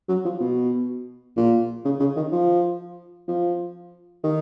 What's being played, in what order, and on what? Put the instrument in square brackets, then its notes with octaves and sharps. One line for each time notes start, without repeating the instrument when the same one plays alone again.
[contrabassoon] F#3
F3
B2
A#2
C#3
C#3
D#3
F3
F3
D#3